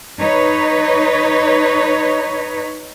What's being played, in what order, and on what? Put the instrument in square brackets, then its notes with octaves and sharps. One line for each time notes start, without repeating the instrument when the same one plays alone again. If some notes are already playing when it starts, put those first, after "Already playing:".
[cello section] D#4 B4 C#5